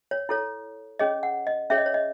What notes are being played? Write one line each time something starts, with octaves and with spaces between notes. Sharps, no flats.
C#5
E4 A4 C#5
C#4 G#4 C#5 D#5
F#5
D#5
C#4 G#4 C#5 E5
D#5
C#5
D#5